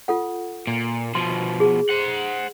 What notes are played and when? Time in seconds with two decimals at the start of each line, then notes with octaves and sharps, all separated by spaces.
0.08 F4 A4 F#5
0.67 A#2
1.15 B2 F3 C6
1.60 G#4
1.90 C5 F#5